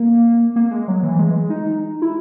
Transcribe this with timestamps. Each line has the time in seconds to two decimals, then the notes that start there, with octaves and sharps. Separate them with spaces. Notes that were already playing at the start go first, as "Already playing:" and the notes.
Already playing: A#3
0.56 A#3
0.71 G#3
0.88 F#3
1.03 E3
1.19 G#3
1.50 D#4
2.02 E4